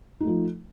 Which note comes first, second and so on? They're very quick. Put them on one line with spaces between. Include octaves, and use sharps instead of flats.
D#4 A3 F3